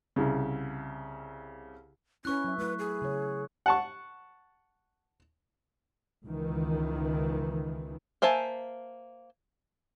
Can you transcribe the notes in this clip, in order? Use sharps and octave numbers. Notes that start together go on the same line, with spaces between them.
C2 C#3
C#4 E4 B4 C#6 F#6
F#3 E5
A3 E4 B4
G#4
C#3 C#5
F#5 A5 C#6
C#2 D#3 E3
A#3 C5 E5 G#5 A5